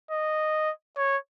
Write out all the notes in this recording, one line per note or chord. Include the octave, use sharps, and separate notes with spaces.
D#5
C#5